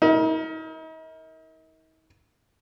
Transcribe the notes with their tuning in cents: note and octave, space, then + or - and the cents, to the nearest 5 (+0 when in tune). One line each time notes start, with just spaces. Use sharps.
D#4 +45 A#4 +0